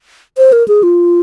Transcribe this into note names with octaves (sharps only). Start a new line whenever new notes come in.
C5
A#4
G#4
F4